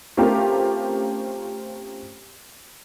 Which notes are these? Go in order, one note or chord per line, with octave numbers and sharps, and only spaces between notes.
A3 C4 C#4 F4 G4 A#4